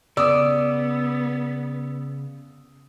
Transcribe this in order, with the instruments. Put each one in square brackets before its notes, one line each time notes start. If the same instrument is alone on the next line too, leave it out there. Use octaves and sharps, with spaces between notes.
[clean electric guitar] C#3 [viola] B3 [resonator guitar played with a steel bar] D5 [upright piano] D#6 E6